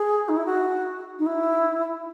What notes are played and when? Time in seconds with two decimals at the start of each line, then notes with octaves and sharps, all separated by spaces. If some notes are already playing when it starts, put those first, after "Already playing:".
Already playing: G#4
0.28 D#4
0.36 E4
0.45 F#4
1.19 D#4
1.26 E4